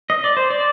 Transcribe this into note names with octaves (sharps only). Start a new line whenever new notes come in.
D#5
D5
C5
D5